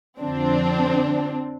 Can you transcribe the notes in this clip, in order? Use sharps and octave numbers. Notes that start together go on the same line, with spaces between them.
F2 D3 F3 C4 D4